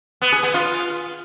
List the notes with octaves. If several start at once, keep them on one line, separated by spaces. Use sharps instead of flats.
B3
G#4
B3
F4